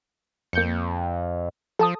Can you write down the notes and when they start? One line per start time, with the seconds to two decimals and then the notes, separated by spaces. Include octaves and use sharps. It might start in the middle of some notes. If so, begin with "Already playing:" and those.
0.53 F2 A#3 G6 C#7
1.79 F3 A4 A5 D#6